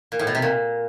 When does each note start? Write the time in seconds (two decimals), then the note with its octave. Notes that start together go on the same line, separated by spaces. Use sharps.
0.12 A#2
0.19 A2
0.27 B2
0.35 C3
0.42 A#2